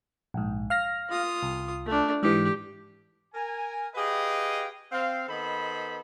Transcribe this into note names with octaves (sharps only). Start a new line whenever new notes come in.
A#1 G#2
F5 F6 A#6
F4 D#6
C2
A3 D4
G#2 E3 G4
A#4 G#5
G4 G#4 B4 D#5 F5 G5
C4 F5
D#3 B3 A4 C5 D#5 B5